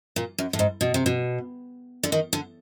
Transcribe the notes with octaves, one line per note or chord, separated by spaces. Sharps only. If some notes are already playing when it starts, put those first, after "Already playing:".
A#2
F#2
A2
G#2
B2
C3
B2
D3
D#3
D3